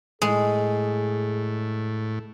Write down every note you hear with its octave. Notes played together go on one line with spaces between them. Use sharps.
A2 G#3 G#4